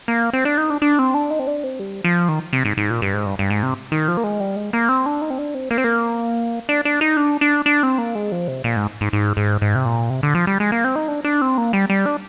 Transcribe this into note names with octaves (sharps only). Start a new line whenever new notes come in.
A#3
C4
D4
D#4
D4
D4
C4
D4
D#4
C4
D4
C4
G3
F3
D#3
C3
G#2
G#2
A#2
G2
G#2
G2
G2
G#2
C3
D#3
F3
A#3
G#3
G3
G#3
A#3
C4
D4
D#4
C4
D4
C4
A#3
C4
A#3
D4
D4
D#4
D4
D4
D4
C4
A#3
G#3
F3
C3
A#2
G#2
G#2
G#2
G#2
G#2
C3
A#2
C3
D3
F3
G3
G#3
A#3
C4
D#4
D4
D4
C4
A#3
G3
G3
D4